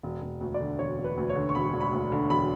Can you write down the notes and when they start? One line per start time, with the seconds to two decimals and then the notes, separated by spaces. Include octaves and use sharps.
0.03 E1
0.22 E1
0.41 D2
0.54 D5
0.60 D3
0.79 E1 C#5
0.98 E1
1.04 B4
1.17 D2
1.29 C#5
1.36 D3
1.49 C#6
1.55 E1 B5
1.73 E1
1.80 B5
1.93 D2
2.12 D3
2.30 E1 B5